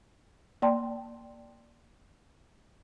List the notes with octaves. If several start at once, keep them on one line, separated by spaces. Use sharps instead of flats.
A#3 D5 G5 A5 C6